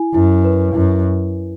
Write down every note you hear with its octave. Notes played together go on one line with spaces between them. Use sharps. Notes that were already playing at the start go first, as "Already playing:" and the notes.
Already playing: E4 G#5
F#2 E4
B4
F#2 E4